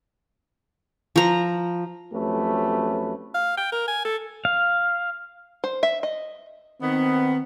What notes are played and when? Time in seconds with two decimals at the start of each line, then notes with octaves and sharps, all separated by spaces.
1.16 F3 A#5
2.12 F2 F#3 A3 C#4 G4 B4
3.34 F5
3.57 G5
3.72 A#4
3.88 G#5
4.05 A4
4.45 F5
5.64 C5
5.83 E5
6.03 D#5
6.81 D#3 B3 C4